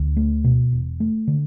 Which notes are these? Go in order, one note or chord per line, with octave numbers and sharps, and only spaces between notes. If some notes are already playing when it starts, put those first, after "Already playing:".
Already playing: D2 D3
A3
B2
E1
A3
D3